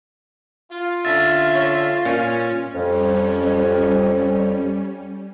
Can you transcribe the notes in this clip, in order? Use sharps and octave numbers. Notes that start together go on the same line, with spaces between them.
F4
D3 C#4 E5 A6
C#5
A#2 C#4
F2 G3 C#4